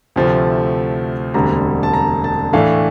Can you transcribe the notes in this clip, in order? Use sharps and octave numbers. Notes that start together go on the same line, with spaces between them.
D2 C3 F3 A3
E1 D2 D3 G3 C4 A#5
A5
A#5
A5
A2 E3 A3 D4 F5